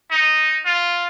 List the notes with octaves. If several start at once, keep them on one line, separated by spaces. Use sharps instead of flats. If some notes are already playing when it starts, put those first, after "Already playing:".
D#4
F4